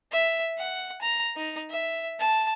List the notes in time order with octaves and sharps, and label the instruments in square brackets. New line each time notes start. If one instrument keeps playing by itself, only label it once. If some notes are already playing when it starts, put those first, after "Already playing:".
[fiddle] E5
F#5
A#5
D#4
E5
A5